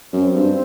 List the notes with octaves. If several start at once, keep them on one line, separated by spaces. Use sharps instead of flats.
F#2 C4
G2